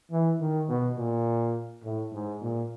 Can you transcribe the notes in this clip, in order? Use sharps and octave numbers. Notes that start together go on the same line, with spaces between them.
E3
D#3
B2
A#2
A2
G#2
A#2